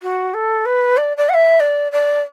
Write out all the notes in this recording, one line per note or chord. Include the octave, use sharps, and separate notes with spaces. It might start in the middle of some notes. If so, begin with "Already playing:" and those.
F#4
A4
B4
D5
D5
F#5
E5
D5
D5